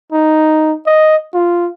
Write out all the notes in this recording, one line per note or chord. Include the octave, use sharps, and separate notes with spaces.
D#4
D#5
F4